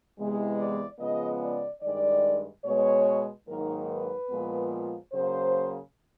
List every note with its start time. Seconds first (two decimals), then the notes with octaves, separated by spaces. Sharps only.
0.17 E2 C3 E3 G#3 B3
0.58 D5
0.99 C#3 F3 G#3 B3 D#5
1.41 D5
1.81 G2 D#3 G#3 D5
2.64 B2 G#3 B3 C#5
3.47 G#2 D#3 F#3 A#3 A#4
3.89 B4
4.29 A#2 F3 G#3 B3
5.12 C#3 F#3 A#3 C5